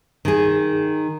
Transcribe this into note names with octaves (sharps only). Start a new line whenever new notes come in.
D#3 G#4